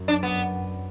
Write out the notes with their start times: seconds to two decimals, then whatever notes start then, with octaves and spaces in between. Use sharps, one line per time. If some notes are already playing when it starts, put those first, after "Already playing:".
Already playing: F#2
0.08 D4
0.23 B3